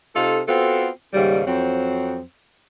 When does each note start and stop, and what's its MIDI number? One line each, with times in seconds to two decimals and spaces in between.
0.15 0.41 48
0.15 0.41 63
0.15 0.41 65
0.15 0.41 69
0.47 0.88 59
0.47 0.88 60
0.47 0.88 65
0.47 0.88 66
0.47 0.88 69
1.14 1.41 39
1.14 1.41 44
1.14 1.41 49
1.14 1.41 55
1.47 2.21 41
1.47 2.21 54
1.47 2.21 60